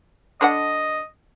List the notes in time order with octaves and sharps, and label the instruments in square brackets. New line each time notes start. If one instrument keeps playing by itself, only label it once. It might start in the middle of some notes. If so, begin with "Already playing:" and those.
[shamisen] D3 D4 F#5 [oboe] D#5